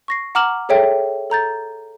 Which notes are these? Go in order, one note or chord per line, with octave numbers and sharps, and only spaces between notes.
C#6 A#6 C7
F#5 A#5 D6 F6 E7 F#7
G#4 A4 C#5 E5 G5
A4 A#5 G6 A6